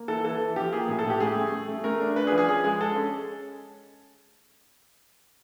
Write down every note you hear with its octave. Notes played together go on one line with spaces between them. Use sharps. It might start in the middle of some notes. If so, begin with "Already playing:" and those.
Already playing: A#3
E3 A4
E3 A4
E3
F3 G4
A#3 G#4
A2 G#4
A4
A2
G4
A3 G#4
A3
A3
A3
A3 A#4
D4
D4 B4
G#4
F3
G#4
C#4 G#4
G#3 G#4
G#3 A4
C#4